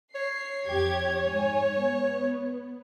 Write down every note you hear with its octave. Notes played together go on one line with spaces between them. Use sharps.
C#5 C7
F2 G4 G#6
G#2 G#5
B3